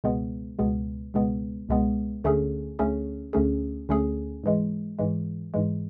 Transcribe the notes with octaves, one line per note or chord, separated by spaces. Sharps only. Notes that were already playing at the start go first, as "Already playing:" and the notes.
C#2 B2 G#3 B3
C#2 B2 G#3 B3
C#2 B2 G#3 B3
C#2 B2 G#3 B3
D2 D3 A3 C#4 G#4
D2 D3 A3 C#4 G#4
D2 D3 A3 C#4 G#4
D2 D3 A3 C#4 G#4
G#2 E3 G#3
G#2 E3 G#3
G#2 E3 G#3